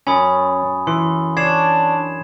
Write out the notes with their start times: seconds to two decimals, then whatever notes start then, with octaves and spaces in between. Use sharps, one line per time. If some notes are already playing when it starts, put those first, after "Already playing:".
0.07 F#2 C#4 G#5 B5 D#6
0.87 E3 C6
1.37 D4 C#5 G#6 C7 E7